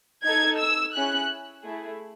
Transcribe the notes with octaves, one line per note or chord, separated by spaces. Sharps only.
D#4 A4 G#6
E6
C#4 E4 G#4 F#6
A3 E4 G#4